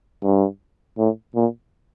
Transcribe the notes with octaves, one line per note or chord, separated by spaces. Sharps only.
G2
A2
A#2